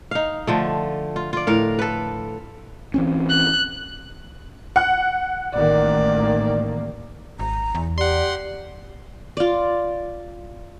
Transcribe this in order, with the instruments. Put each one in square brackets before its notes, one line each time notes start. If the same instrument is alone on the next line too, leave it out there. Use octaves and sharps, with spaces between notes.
[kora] D#4 F5
D3 F3 A3
F4
F4 D5
A2 A#4 F5
A4 B4
[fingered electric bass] E3 C4 C#4
[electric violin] F#6
[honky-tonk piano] F#5 F#6
[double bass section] A1 D#3 A#3 [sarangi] D5
[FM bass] G#1 [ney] A#5
[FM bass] E2
[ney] G4 [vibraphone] D5 [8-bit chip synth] F#5 C6
[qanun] F4 D5